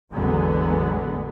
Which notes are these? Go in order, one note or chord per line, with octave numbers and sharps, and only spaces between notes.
A1 E2 D3 F#3 G#3 B3